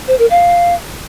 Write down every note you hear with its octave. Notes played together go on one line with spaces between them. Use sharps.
C5
A#4
F5